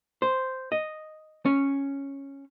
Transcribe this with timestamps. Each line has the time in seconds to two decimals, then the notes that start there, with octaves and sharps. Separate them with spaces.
0.22 C5
0.72 D#5
1.45 C#4